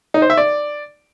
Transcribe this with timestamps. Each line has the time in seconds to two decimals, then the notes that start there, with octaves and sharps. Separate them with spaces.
0.14 D#4
0.22 C5
0.30 E5
0.37 D5